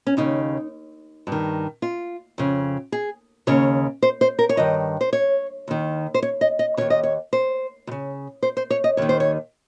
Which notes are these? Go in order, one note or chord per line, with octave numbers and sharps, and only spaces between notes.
C#4
D#2 C#3 D#4
G2 D#3
F4
F2 C#3
G#4
D#2 C#3 C#5
C5
C5
A#4
C#5
G2 D#3 D#5
C5
C#5
D#2 D#3
C5
C#5
D#5
D#5
D#2 C#3 C#5
D#5
C#5
C5
D#2
C#3
C5
C5
C#5
D#5
D#2 D#3 C#5
C5
C#5